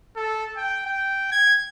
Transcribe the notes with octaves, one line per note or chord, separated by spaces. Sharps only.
A4
G5
G5
G#6